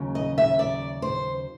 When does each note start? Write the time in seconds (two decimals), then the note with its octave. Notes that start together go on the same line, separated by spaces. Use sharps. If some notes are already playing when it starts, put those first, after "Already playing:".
Already playing: D#2 C#3 F#3
0.15 D#5
0.38 E5
0.59 D5
1.02 C5